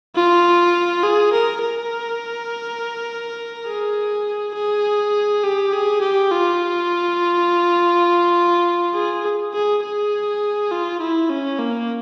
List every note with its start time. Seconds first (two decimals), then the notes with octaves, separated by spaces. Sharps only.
0.15 F4
1.03 G#4
1.33 A#4
1.62 A#4
3.67 G#4
4.55 G#4
5.44 G4
5.73 G#4
6.01 G4
6.31 F4
8.95 G#4
9.54 G#4
9.83 G#4
10.71 F4
11.01 E4
11.30 C#4
11.59 A#3